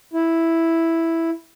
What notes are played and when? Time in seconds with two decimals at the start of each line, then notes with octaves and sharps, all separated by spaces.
0.14 E4